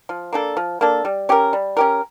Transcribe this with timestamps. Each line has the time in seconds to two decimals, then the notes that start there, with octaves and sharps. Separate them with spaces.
0.09 F3
0.33 A#3 D4 A4
0.57 F3
0.81 A#3 D4 A4
1.05 G3
1.29 C#4 G4 A#4
1.53 G3
1.77 C#4 G4 A#4